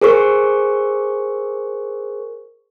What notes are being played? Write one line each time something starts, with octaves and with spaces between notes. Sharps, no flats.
G#4 A#4 C5 C#6